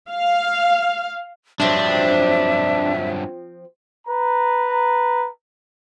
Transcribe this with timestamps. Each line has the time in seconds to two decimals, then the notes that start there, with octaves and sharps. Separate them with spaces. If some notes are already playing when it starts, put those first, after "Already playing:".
0.11 F5
1.60 G2 F3 F#3 C4 D4 E5
4.07 B4 A#5